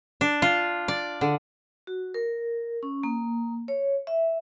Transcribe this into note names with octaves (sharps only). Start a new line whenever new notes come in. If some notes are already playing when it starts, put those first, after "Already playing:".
D4
F4
D5
D3
F#4
A#4
C#4
A#3
C#5
E5